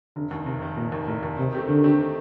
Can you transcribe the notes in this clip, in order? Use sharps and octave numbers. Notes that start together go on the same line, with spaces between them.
F1 D3
D#2 D#3
F1 C3
D#2 D#3
F1 A#2
D#2 D#3
F1 A2
D#2 D#3
C3 D#3
A3 C4 G4
D3 D#3
A3 C4 G4
D#3